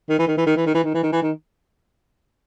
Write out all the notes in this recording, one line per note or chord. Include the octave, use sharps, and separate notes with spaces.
D#3
E3
D#3
E3
D#3
E3
D#3
E3
D#3
E3
D#3
E3
D#3